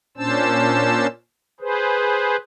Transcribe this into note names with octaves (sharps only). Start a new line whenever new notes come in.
A#2 C#4 D4 C5 A5 E6
G#4 B4 C5